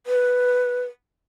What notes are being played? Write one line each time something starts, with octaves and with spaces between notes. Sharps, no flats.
B4